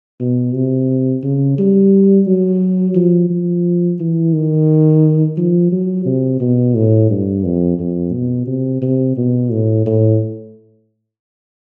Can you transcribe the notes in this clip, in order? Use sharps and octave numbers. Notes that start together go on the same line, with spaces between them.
B2
C3
C#3
G3
F#3
F3
F3
E3
D#3
F3
F#3
C3
B2
A2
G2
F2
F2
B2
C3
C3
B2
A2
A2